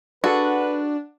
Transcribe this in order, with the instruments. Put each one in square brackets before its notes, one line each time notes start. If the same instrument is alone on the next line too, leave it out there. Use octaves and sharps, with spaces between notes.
[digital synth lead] D4 [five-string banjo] F#4 [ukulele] G#4 A4 F#5 [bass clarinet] B4